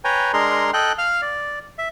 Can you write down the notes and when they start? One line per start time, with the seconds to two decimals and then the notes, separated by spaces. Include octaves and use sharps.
0.04 B4 C#5 G5 G#5 A#5
0.33 G#3 D4 G#4 A#4 A#5 C6
0.73 A4 D#5 G5 F#6
0.98 F5 F6
1.22 D5
1.78 E5